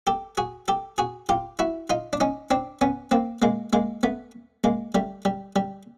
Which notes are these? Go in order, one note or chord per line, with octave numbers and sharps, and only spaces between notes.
G4 A4
F#4 G#4
G4 A4
F#4 G#4
F4 G4
E4 F#4
D#4 F4
D4
C#4 D#4
C4 D4
B3 C#4
A#3 C4
G#3 A#3
G#3 A#3
A3 B3
G#3 A#3
G3 A3
G3
G3